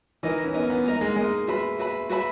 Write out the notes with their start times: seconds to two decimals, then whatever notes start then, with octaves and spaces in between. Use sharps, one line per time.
0.23 E3 D#4 A#4 D#5
0.44 C#4
0.54 B3 D#4 A#4 D#5
0.70 B3
0.85 A#3 D#4 A#4 D#5
1.01 G#3
1.16 G#3 D#4 A#4 D#5
1.47 F#4 B4 E5 B5
1.79 F#4 B4 E5 B5
2.09 F#4 B4 E5 B5